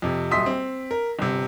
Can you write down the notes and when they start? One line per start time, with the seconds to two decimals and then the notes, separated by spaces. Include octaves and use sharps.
0.02 F2 C3
0.31 D#1 B1 E5 C6 D#6 B6
0.46 C4
0.91 A#4
1.19 G1 C3